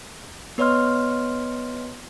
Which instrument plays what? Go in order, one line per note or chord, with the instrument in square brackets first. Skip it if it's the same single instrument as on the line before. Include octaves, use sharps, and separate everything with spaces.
[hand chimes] B3 B4 C#5 D#5 C6 F6